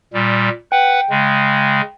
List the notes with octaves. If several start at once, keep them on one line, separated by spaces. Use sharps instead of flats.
A#2 G3
B4 F#5 G5
C#3 G#3